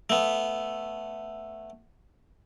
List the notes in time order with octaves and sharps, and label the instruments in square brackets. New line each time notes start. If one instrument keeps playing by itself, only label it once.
[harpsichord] A3 B3